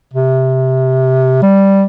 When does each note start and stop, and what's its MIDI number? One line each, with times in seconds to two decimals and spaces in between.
0.13 1.38 48
1.42 1.84 55